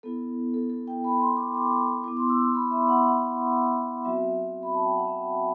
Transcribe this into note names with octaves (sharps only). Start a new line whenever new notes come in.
B3 E4 A4
A4
A4
G5
B5
C6
D6
D6
B3 E4 D6
C6
E6
C6
B5
E5
F#5
F#5
F#3 C4 F#4 E5
B5
A5
G5
F#5
E5